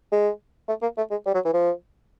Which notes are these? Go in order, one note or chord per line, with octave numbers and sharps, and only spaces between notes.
G#3
A3
A#3
A3
G#3
G3
F#3
E3
F3